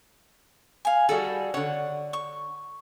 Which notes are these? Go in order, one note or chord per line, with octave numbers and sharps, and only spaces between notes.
F5 G#5
G3 F#4 G#4 A4
D3 C#5 F#5
C#6